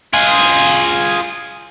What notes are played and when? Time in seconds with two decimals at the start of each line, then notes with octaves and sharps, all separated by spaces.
0.13 F4 G#4